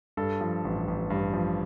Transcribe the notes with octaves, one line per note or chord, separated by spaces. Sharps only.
G2 A4
F3
A1
A1
G2
F3